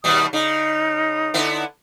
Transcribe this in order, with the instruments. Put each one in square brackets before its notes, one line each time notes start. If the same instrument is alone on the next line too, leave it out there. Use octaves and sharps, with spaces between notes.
[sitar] D#2 B2 G3 [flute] D#6
[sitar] C#3 [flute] D#4
[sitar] D3 B3 E4